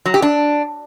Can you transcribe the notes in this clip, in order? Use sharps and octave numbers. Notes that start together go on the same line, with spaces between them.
F#3
G4
D4